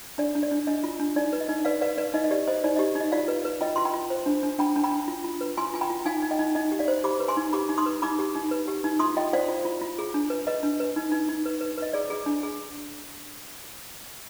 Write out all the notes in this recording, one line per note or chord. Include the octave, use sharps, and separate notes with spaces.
D4 D5
D4
D5
D4
D4 D#5
F4
D4
D#4 D5
B4
D#5
D#4
B4 D5 F5
B4 D5 F5
B4 D5
D#4 D#5
D#5
G4 D5
C5 D#5
D#4 D5
D#5
G4
D#4
D#5
F4 D5 F5
B4
B4
F4 D#5 G5
F4 C6
G5 B5
F4
C5
D4
D4
D4 G5 B5
D4
G5 B5
D4
F4
F4
B4
F4 G#5 C6
F4 G#5
G5 B5
F4
D#4 F5 G#5
D#4
D#5 G5
D#4
D#4 D#5
G4
D5 F5
C5
G4 B5 D6
B4
G#5 C6
D#4
G4 B5 D6
D#4
C6 D#6
B4
D#4 B5 D6
G4
D#4
B4
G4
D#4
F4 C6 D#6
F4 D#5 G5
C5 D5 F5
F4
F4
F4
G#4
D4
B4
B4 D#5
D4
B4
D#4
D#4
D#4
B4
B4
B4 D#5
G#4 D5
G#4
D4
G#4